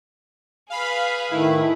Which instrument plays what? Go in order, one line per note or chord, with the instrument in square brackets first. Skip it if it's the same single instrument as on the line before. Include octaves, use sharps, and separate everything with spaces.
[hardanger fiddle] G#4 B4 [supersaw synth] F5 B5
[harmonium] A2 D#3 A3 [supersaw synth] E4